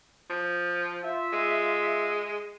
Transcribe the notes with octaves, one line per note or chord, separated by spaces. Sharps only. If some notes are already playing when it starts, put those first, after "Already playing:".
F3
F4 E5
G#3